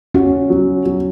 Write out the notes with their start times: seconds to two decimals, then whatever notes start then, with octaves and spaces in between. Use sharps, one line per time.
0.15 C#4 F#4
0.50 F#3
0.86 F#3